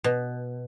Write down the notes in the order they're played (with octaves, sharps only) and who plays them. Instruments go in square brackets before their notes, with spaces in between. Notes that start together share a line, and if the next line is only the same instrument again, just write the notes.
[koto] B2